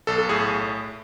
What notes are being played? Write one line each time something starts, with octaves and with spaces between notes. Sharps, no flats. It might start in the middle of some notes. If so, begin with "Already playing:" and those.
B1 A4
A4
A2 G#4